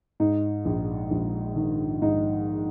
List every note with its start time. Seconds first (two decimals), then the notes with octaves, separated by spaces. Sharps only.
0.20 G#2 D#4
0.65 A#1
1.11 A#1
1.56 D#3
2.01 G#2 D#4